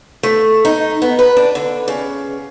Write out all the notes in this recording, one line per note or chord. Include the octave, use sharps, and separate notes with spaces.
A3
D#4
B3
B4
D4
D3
C#3